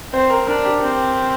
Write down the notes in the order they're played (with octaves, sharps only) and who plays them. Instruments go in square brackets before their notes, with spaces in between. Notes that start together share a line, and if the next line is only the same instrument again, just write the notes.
[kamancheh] C4 [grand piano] C5
[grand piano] A#4
[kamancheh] D4 [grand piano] A#4
[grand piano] G4
[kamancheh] C4